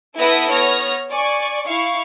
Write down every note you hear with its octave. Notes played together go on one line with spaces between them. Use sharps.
B3 E4 A4 B4 E5 A#6
B3 C#5 F6 A#6
D5 G#5 C#6
E4 F5 C#6